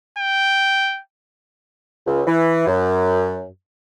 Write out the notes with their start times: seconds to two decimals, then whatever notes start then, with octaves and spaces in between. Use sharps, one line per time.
0.18 G5
2.07 C#2
2.27 E3
2.67 F#2